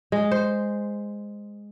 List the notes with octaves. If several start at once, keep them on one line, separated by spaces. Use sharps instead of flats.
G#3
C5